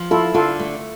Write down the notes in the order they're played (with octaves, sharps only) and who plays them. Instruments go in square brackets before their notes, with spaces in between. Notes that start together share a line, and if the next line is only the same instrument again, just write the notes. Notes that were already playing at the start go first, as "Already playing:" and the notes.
Already playing: [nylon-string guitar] F3
[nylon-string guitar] E4 [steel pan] F4 A4
[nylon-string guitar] D3 [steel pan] F4 A4
[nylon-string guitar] A3